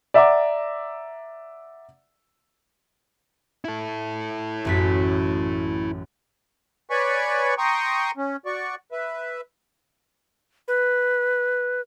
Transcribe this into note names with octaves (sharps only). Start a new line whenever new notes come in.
D5 E5 F#5 A#5 D6
E4 A4
A1 F#2 B6
B4 C#5 D5 G#5 B5 C#6
G5 A#5 C6 C#6 D#6
C#4
F#4 D5 C#6
B4 E5
B4